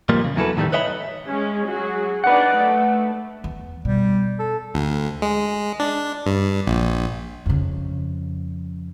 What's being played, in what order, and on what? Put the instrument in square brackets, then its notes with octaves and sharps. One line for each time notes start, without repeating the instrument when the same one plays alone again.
[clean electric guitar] A#2 F3 G3 A#3
C#3
E2 F#3 E4 G#4 A4 B4
A2 D#3 E3 G3 A3
B4 C#5 D#5 E5 G5 B5
[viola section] G#3 C#4
F#3 F#4 G#4
[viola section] D4 D#4 D5 [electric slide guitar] B4 F#5
[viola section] A3
[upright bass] E2
[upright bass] B2 [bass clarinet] G3
[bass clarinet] A4
[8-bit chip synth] D2
G#3
D4
G2
A#1
[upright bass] F2 C#3